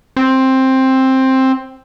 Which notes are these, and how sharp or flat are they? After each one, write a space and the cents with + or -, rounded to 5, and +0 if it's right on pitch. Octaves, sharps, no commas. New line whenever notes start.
C4 +10